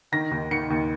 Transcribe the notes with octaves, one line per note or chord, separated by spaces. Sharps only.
D#3 A#6
D#2
D#3 C#7
D#2